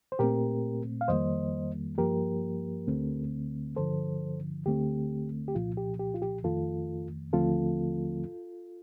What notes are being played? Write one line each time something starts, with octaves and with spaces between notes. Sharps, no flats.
C5
A#2 A3 C4 G4 A#4
F5
F2 D#3 G3 A#3 C5 D#5
G2 F3 A#3 G4 A#4
D2 D3 A3 C4
G2 D3 F3 A4 C5
D2 D3 A3 C4 G4
G4
C2 A#2 F3 F4
G4
G4
F4
G4
F2 D#3 A3 F4 A4
D#2 D3 F3 A3 C4 F4 A4